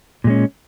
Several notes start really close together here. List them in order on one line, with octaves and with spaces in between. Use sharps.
A#2 G#3 C#4